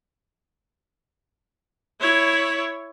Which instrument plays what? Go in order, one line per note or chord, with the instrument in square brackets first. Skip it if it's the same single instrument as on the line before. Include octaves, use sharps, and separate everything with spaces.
[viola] E4 C#5